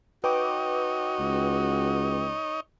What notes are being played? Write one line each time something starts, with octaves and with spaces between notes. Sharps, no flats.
D#4 F#4 B4 C#5 D#5 G5 D6
C#2